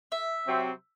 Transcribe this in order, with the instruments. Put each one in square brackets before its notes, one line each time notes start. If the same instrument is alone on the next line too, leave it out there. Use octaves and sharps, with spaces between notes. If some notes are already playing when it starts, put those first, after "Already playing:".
[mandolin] E5
[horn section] C3 F#3 C4